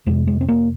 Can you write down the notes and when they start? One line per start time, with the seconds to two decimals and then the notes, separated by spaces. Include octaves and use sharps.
0.06 F2 C3 G#3
0.27 G#3
0.41 C4
0.48 A#3